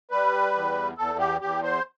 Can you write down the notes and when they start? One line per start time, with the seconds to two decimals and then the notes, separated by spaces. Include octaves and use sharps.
0.11 G3 B4
0.54 E2
0.98 E2 A4
1.19 G4
1.41 E2 G4
1.63 C5